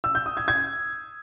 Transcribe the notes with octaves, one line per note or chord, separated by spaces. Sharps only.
E6
G6
D#6
G#6
G#6